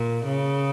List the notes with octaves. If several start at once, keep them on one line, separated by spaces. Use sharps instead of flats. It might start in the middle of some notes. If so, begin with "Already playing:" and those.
Already playing: A#2
C#3